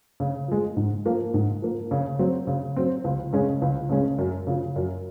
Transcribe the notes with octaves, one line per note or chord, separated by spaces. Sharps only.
C#3
F3 G#3
G#2
F3 A#3
G#2
F3 A#3
C#3
F#3 C4
C#3
F#3 C4
C#2
C#3 G#3 C#4
C#2
C#3 G#3 C#4
F#2
C#3 F3
F#2